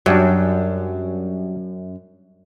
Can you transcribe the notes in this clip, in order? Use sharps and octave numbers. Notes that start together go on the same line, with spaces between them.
F#2 F#3 G3 D4